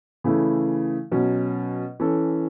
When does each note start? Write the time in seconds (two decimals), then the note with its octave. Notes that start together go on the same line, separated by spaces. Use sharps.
0.24 C#3 E3 A3 E4
1.11 B2 F#3 C#4
2.00 E3 C#4 A4